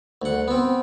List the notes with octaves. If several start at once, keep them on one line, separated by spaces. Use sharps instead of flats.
D2 F#5
B3 C4